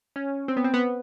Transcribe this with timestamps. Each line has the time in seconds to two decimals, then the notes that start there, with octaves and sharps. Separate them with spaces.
0.16 C#4
0.48 C4
0.57 B3
0.64 C4
0.74 B3